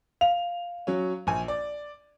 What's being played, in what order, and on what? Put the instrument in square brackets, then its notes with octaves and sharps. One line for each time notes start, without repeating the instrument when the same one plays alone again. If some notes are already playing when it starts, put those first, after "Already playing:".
[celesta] F5 [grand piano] F7
[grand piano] F#3 C#4
A#1 G#5
D5